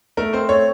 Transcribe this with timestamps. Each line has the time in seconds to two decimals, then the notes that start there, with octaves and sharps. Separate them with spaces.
0.17 A3 A#4
0.33 C4 C5
0.49 A3 C#5